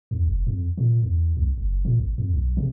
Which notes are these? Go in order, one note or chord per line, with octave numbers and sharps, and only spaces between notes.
E2
F1
F2
A#2
E2
C2
F#1
A#2
G#1
F2
B1
C3